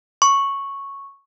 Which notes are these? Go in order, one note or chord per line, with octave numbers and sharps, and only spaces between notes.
C#6